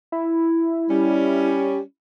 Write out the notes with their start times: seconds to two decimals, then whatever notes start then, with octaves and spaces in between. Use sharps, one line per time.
0.12 E4
0.90 G3 C#4